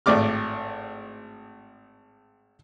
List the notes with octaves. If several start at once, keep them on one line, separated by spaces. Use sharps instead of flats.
G#1 A2 D5 D6 F6